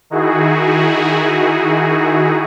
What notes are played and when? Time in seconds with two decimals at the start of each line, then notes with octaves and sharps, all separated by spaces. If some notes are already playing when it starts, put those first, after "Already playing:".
0.10 D#3 D#4 E4 F#4 G#4